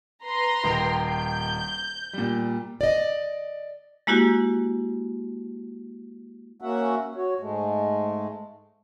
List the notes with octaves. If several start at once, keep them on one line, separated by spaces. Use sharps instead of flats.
B4 A#5 C6
D#1 D#3 G5
G6
A#2 G3
D5 D#5
G#3 A#3 E4 F#4 G4
A#3 C#4 F#4 E5 F#5
F#4 C#5
G#2 G#3 A3